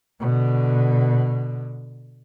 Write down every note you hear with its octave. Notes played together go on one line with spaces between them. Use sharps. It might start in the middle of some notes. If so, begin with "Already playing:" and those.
B2 D3